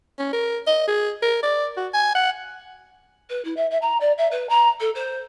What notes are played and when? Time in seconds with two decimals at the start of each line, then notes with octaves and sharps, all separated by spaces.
0.19 C#4
0.33 A#4
0.67 D#5
0.87 G#4
1.23 A#4
1.43 D5
1.77 F#4
1.94 G#5
2.15 F#5
3.30 B4
3.44 E4
3.56 E5
3.71 E5
3.82 A#5
4.00 D5
4.18 E5
4.31 B4
4.49 A#5
4.80 A4
4.95 C5